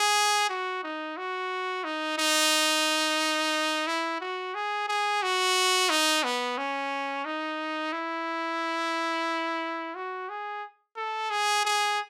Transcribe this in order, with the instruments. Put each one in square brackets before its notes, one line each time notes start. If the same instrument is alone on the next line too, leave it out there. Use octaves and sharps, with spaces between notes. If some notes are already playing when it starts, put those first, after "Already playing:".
Already playing: [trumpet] G#4
F#4
D#4
F#4
D#4
D#4
E4
F#4
G#4
G#4
F#4
D#4
B3
C#4
D#4
E4
F#4
G#4
A4
G#4
G#4